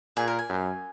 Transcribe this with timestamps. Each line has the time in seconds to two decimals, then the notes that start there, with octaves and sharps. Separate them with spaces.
0.16 A#2 G#4
0.28 A#4
0.39 G#5
0.49 F#2